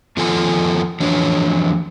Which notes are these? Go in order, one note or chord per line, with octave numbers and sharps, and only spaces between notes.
F2 F3 B3 F4 A4 G#5
F2 E3 F#3 D4 C#5